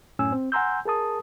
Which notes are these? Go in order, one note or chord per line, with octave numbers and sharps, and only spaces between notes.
F#2 A2 C#4 G#5 E6
C4
F#5 G#5 A#5 C6 E6 G6
G#4 A#4 A5 D#6